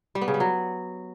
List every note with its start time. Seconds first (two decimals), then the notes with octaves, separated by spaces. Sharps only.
0.15 G3
0.21 B3
0.28 C#3
0.34 G3
0.40 F#3